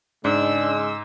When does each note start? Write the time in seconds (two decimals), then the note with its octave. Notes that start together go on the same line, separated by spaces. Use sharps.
0.25 G#2 C#3 G#3 D4 E6